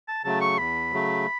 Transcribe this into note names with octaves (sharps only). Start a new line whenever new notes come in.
A5
C#3 F#3 A3 A5
C#6
E2 B5
C#3 F#3 A3